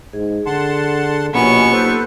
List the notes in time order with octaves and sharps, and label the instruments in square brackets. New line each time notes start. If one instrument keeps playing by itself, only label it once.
[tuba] G#2 [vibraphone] G#4
[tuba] D3 [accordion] F#5 A5 C6
[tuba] A#1 [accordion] B2 C#4 [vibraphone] A#3 F4 G4 [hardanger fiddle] B3 C#6
[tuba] B1 [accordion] A4 B4 C5